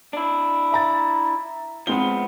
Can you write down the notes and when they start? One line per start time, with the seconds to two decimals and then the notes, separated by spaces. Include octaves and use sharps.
0.13 D4 E4
0.72 E5 A#5 A6
1.87 F3 G#3 B3 C4 G7